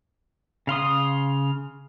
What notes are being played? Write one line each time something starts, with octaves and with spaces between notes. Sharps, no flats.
C#3 F5 C6 D#6